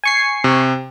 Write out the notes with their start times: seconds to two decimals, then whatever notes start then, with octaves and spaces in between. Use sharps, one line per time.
0.04 G#5 C#6 C7
0.44 C3